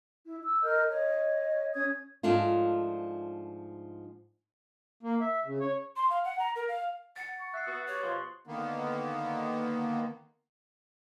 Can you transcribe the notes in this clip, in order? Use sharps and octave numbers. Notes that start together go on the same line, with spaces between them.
E4
E6
A#4 D#5 F6 G6
C#5 D#5
C#4 C#5 D#6 G#6
G#2 F3 A3 D4 F4
A#3
E5
C#3
C#5
C6
F5
F#5
A#5
A#4
F5
F#5 A6 C#7
C#6
E5 F#6 A6 C7
B3 F#4 D#6
G4 C#5
B2 F3 C6 C#6
D3 D#3 A#3 B3